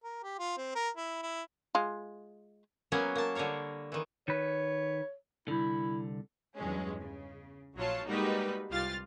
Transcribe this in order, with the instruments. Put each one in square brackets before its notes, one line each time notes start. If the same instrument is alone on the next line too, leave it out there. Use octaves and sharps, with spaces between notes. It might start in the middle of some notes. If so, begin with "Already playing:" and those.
[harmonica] A#4
G4
F4
C4
A#4
E4
E4
[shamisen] G#3 F4
[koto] F#3 A#3 B3 C#4
A#3 A5
D3 G3 A#4 C#5 F5
D#3 E3
[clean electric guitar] D#3 B4 [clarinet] C#5
[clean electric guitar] C2 D3 [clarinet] E4
[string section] E2 G2 F#3 G#3 C#4
C#3
A#1 F#3 F4 C#5 A5
G3 G#3 A#3 D#4 F#4 B4
C2 G3 F4 F6 A6